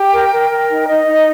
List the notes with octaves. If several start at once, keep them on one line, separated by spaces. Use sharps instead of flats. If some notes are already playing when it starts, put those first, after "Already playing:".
Already playing: G4 G5
A#4
A#4
A#4
D#4
D#4 D#5
D#4